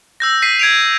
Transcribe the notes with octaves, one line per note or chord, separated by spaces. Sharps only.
E6 G6 A#6
B6 C7 D#7
G#6 D7 F7